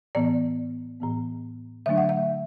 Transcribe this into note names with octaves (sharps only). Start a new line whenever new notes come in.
A2 E3 B3 D5
A2 E3 B3
D3 F#3 A3 D4 E5
F#5
E5